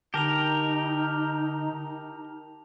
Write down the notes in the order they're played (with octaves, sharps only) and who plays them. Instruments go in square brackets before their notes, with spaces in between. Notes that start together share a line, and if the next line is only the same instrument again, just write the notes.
[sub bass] D3 [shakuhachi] D#4 [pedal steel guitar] G4 A#4 [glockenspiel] A5 F7